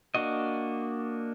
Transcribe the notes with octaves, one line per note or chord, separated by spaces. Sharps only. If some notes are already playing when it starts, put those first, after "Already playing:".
A#3 D4 F#4 D#5